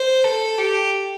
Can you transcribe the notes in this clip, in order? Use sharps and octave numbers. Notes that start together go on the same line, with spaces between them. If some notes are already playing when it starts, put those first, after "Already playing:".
Already playing: C5
A4
G4